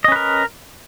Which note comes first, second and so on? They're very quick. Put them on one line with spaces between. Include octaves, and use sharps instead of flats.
D#5 C#4 B4 A#4